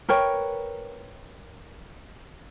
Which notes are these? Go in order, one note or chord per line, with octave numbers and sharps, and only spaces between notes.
A#4 B4 C#5 G5